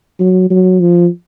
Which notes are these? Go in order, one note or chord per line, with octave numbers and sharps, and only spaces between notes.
F#3
F#3
F3